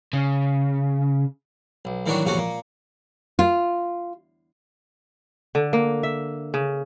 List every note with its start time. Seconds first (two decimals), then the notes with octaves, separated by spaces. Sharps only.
0.13 C#3
1.85 B1
2.06 A2 D#3 E3 F#3 D4 F#4
2.25 A#1 E2 C3 C#4 F#4 A4
2.38 A#2 A#3
3.39 F4
5.55 D3
5.73 A#3
6.03 E5
6.54 C#3